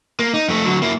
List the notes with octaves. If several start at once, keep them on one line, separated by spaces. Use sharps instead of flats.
A#3
D#4
F2 A3
D3 F#3
A#3 E4